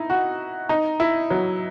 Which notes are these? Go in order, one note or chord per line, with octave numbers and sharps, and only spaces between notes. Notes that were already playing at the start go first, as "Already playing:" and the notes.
Already playing: D#4 E4
F#4
D#4
E4
F#3